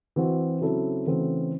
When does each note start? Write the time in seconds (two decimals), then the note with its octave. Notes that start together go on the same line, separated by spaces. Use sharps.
0.16 E3 C4 F#4
0.61 C#3 F#3 C4 E4 A4
1.06 C#3 E3 A3 C4 F#4